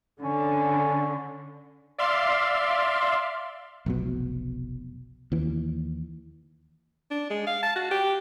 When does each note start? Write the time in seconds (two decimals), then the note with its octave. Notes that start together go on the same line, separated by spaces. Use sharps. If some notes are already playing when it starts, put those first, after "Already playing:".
0.22 D3 C#4
1.98 D5 E5 F5 C6
3.86 F1 B1 B2
5.32 D#2 E3
7.11 D4
7.30 G#3
7.47 F5
7.63 A5
7.76 F#4
7.91 G4